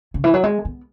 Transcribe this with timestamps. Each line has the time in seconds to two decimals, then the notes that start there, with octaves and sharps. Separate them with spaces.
0.14 C#3
0.24 E3
0.34 F#3
0.44 G#3
0.65 B3